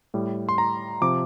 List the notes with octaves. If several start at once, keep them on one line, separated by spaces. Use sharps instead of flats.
A2 G3
C6
A#5
C3 F3 D6